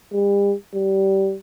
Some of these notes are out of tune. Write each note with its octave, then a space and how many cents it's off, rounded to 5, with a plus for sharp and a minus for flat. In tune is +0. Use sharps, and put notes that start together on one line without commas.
G3 +40
G3 -20